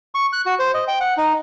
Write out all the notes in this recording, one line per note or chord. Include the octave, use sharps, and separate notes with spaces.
C#6
F#6
F#4
C5
D#5
G5
F#5
D#4